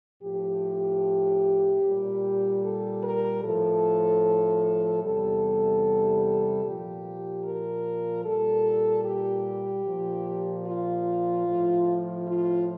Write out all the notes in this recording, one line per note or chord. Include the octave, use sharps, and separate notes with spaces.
A2 F3 G4
A#2 G3
A4
A#4
A2 F3 A4
E2 C3 G3 A4
A#2 F3 G4
A#4
A#2 G3 A4
G4
A#2 F3
F4
A2 F3
F4